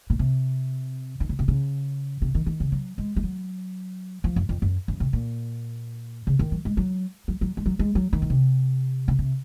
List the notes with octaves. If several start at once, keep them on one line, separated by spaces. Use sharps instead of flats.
A#2
C3
D#3
C#3
C3
C#3
C3
D#3
D#3
C#3
F#3
G#3
G#3
F#3
F3
F#2
F2
F#2
F#2
C3
A#2
C#3
D#3
F#3
G#3
F#3
F#3
F#3
G#3
F#3
G#3
F#3
D#3
A#2
C3
C#3
C3